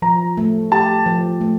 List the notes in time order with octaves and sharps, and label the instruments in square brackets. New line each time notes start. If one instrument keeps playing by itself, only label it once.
[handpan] F3 [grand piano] A#5
[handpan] A3
[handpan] G4 [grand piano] A5
[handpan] F3
A3